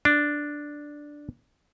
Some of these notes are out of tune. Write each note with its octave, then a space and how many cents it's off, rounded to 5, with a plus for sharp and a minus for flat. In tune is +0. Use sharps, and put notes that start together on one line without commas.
D4 +0